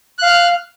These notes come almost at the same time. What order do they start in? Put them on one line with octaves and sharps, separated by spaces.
F#6 F5 F6